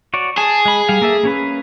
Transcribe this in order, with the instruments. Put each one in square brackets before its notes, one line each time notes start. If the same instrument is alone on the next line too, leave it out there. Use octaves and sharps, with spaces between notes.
[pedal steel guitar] F#4 C#5 D5
[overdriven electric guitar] G#4 [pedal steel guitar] A5
[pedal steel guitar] G#3 B5
G3 F5
A#3 A4 E5
A#3 C#4 B4